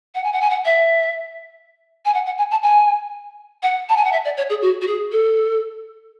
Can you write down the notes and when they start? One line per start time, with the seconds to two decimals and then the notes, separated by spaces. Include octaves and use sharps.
0.15 F#5
0.24 G#5
0.33 F#5
0.41 G#5
0.50 F#5
0.65 E5
2.05 G#5
2.14 F#5
2.26 F#5
2.38 G#5
2.51 A5
2.63 G#5
3.63 F#5
3.89 A5
3.97 G#5
4.05 F#5
4.12 E5
4.25 D5
4.37 C#5
4.50 G#4
4.62 F#4
4.81 F#4
4.87 G#4
5.12 A4